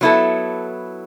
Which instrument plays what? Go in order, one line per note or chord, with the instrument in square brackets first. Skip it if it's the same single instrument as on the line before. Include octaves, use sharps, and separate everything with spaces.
[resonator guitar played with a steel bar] F#3 B3 E4 A4